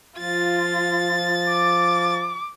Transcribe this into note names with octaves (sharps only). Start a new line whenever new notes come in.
F3 F4 A6
D6